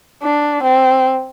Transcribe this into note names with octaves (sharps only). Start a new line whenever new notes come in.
D4
C4